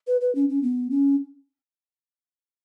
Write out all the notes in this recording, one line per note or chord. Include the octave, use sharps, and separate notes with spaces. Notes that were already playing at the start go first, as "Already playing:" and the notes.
B4
B4
C#4
C#4
B3
C#4